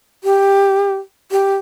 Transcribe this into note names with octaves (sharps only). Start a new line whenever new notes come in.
G4
G4